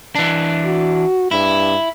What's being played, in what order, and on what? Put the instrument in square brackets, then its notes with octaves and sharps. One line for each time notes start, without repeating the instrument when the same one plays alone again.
[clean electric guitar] E3 D4
[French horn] F#4
[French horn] G2 [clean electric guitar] E4